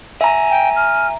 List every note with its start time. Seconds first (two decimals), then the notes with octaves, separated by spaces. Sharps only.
0.21 E5 G#5 A#5
0.50 G5
0.76 F6